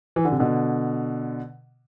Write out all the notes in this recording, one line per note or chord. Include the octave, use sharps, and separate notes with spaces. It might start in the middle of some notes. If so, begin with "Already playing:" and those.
E3
D3
C3
B2 D3